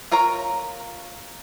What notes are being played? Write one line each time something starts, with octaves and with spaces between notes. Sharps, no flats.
F4 A#4 C#5 A#5